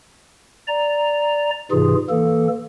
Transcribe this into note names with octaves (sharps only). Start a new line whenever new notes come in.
D5 A#5
G#2 C3 E3 F4 G#4
E3 A#3 A4